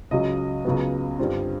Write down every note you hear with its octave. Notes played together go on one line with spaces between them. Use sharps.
C#2 C#3 F#3 D#5
C#2 C#3 F#3 B3
G2 D3 G3 C4 F4